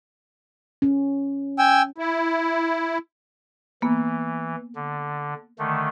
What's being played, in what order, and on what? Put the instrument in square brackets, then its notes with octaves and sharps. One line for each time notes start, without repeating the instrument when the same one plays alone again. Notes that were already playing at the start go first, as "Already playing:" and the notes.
[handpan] C#4
[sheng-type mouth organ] G5 G#5 E6
[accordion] E4
[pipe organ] E3 [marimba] A#3 B3
[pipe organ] D3
D3 D#3 A3